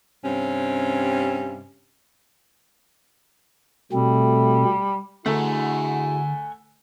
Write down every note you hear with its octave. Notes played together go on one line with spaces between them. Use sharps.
G2 C3 C4 C#4
B2 G3 A3 C4
D3 A3 E4 F#4 G#4 F#5 G#5 A#5